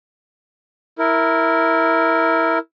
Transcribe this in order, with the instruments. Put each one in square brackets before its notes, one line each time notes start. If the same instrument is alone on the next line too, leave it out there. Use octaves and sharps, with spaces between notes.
[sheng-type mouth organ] E4 A#4